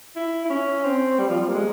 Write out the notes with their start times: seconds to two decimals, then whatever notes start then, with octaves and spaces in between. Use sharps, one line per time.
0.16 E4
0.45 E4
0.50 C#4
0.85 C4
1.19 G3
1.30 F3
1.38 G3
1.49 A#3
1.54 G#3